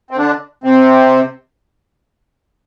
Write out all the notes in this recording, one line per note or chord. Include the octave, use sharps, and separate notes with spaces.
C4
D3 D4
C3 C4